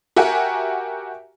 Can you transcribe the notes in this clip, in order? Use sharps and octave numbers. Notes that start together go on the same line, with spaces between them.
F#4 G4 A#4 E5 F#5 G#5